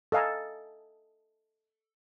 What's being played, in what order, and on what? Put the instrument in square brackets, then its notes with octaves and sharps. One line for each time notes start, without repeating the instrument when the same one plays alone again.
[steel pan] A4 D#5 F5 G#5 A#5